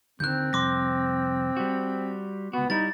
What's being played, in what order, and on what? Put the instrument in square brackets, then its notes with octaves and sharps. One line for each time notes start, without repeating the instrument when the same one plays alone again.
[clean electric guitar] D#2 D3 D#3 [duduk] C4 [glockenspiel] F#6 G6
[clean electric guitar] C2 F2 [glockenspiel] C6 D6 A#6
[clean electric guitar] G3 F#4
[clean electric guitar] C#2 F#4 [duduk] B3
[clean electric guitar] G3 E4 [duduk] D#4 [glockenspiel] A6